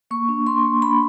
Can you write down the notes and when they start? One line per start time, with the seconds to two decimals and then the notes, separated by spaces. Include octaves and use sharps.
0.11 A#3 C#6
0.29 D4
0.47 D4 C6
0.65 A#3
0.82 D4 B5